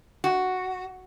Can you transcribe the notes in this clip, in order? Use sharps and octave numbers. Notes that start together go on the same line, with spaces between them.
F#4